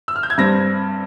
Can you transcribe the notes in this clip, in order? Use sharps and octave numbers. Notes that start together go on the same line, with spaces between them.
E6
F6
G6
G#6
G2 G3 C4 A#6